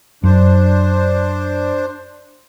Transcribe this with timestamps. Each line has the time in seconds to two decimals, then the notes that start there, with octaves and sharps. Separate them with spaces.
0.24 F#2 D4 C5